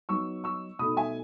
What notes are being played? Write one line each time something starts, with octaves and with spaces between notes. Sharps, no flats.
F#3 B3 D#4 C#6 E6
C#6 E6
B2 A3 D#4 B5 D#6
E5 G#5